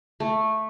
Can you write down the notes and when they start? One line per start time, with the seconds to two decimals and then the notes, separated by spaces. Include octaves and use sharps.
0.20 A3